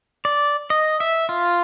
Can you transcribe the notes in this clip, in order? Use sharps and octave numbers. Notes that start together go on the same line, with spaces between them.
D5
D#5
E5
F4